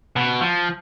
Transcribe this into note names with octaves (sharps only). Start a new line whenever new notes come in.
B2
F3